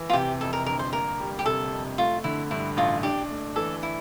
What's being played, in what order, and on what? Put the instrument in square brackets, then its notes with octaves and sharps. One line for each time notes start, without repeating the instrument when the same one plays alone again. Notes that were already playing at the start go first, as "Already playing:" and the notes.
Already playing: [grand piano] E3
[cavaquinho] F4
[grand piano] C3 [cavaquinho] G4
[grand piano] F2 [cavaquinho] A4
[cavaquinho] A#4
[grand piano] G1 [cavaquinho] A#4
[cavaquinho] C5
[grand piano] A#3 [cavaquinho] A#4
[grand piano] G3
[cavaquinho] G4
[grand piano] C3 [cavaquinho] A4
[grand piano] F2
[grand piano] A3 [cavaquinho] F4
[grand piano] D3 [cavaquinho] E4
[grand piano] G2 [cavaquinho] E4
[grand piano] A1 [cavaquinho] F4
[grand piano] D4 [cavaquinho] G4
[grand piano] A3
[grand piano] E3 [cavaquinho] A4
[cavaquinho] E4